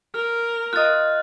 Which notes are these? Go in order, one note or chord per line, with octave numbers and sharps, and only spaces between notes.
A#4 F6
F4 D#5 D#6 F6 F#6 A6